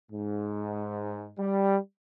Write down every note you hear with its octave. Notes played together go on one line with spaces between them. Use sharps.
G#2
G3